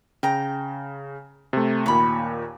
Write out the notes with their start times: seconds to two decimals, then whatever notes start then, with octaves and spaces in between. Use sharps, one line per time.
0.23 C#3 G5 A#5
1.53 C3 A3
1.86 D#2 A#2 C#5 B5